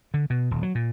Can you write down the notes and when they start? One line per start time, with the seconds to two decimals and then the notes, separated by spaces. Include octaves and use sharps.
0.14 D3
0.30 B2
0.51 D#1
0.63 F#3
0.75 A#2